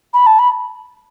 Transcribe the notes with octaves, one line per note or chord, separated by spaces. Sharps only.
B5
A5
B5